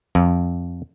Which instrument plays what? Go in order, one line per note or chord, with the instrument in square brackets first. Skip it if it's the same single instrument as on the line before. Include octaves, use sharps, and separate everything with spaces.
[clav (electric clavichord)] F2